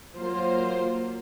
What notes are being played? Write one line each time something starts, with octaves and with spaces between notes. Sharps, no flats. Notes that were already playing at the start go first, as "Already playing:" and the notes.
F#3 A#3 F4 C5